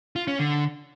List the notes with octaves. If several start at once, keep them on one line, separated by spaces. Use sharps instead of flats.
F4
C#4
D3